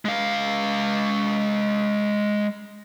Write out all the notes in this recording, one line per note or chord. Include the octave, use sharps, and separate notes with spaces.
G#3 F5